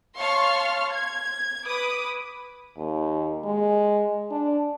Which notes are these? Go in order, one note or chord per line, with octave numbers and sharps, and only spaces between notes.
C#5 F5 A5 C6 C#6 F6
G#6
B4 B5 D6 D#6
D#2
G#3
D4